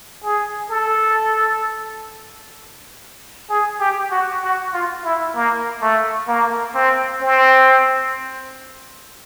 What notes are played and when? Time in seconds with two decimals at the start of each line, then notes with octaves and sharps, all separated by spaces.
0.24 G#4
0.70 A4
3.49 G#4
3.80 G4
4.11 F#4
4.42 F#4
4.73 F4
5.04 E4
5.35 A#3
5.82 A3
6.28 A#3
6.75 C4
7.21 C4